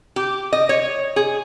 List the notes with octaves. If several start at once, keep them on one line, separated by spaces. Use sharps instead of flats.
G4
D#5
C#5
G#4